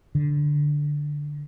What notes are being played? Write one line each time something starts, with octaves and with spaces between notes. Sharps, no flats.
D3